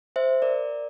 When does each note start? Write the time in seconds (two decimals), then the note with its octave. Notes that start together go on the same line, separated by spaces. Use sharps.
0.16 C5 E5
0.42 A#4 D5